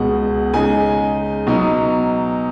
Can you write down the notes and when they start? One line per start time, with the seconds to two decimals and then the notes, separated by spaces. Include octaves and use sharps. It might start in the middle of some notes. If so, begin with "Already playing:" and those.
Already playing: C#2 B2 G#3 F#5
0.54 C#3 G#3 D#4 G#5
1.47 B2 F#3 D#4